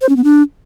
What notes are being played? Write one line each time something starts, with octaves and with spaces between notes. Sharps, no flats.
C5
C#4
B3
D4